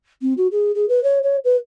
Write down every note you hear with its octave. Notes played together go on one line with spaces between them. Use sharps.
C4
F#4
G#4
G#4
B4
C#5
C#5
B4